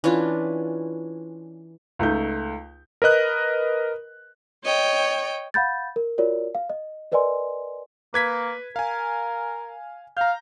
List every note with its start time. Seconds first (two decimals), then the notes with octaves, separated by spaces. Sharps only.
0.04 E3 C#4 D4 F4
1.99 C#2 A3 D#4 G6
3.02 A#4 B4 D#5 F#6
4.64 C#5 D#5 G5
5.54 F5 F#5 B5 G6 A6
5.96 A#4
6.18 F4 F#4 A#4 C#5 D5
6.55 F5
6.70 D#5
7.12 A#4 B4 D5 D#5 G#5 C6
8.14 A#3 B4 G#6 B6
8.76 A#4 F5 G#5
10.17 F5 A#5 G6